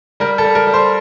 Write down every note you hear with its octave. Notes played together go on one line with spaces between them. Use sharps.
G3 A#4
A4
G3
A#4
G3
C5